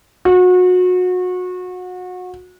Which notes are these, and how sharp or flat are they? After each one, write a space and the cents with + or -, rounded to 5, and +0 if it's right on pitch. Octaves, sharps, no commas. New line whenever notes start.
F#4 -30